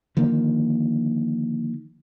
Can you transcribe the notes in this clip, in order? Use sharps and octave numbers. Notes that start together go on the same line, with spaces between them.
D3 D#3 F3 A#3